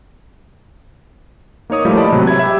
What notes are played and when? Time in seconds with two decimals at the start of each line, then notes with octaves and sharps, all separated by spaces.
1.70 A#3 D#4 C#5 D#6
1.85 F3 G3 A3 A#3 E4
1.97 D5 D#5 A5 B5
2.12 A2 C3 E3 F#3 G#3
2.27 E5 B5 G#6
2.39 G4 E5